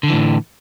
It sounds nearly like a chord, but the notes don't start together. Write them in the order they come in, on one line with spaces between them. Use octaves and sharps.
D3 E3 A2